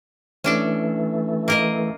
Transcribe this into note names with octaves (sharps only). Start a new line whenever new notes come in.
E3 A3 C#4 D4 A4
A#3 A#4 D#5